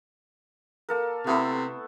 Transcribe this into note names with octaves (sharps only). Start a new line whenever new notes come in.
A#3 A4 A#4
C3 A3 B3 E4